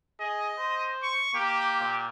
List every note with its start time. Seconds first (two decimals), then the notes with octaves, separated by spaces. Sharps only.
0.20 G#4 D#5
0.59 C5
1.02 C#6
1.34 A#3 G4
1.81 A#2